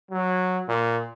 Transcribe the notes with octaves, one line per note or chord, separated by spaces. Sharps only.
F#3
A#2